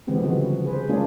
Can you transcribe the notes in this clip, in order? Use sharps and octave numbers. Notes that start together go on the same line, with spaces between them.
D3 E3 G#3 B3 C4 G4
C#3 F3 G3 B3 F#4
G#4 B4 C5
G#3 A#3 C#4 D4 F4 G#4